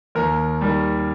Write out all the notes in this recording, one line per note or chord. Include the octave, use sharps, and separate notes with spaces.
D#2 A#4
D#3 G3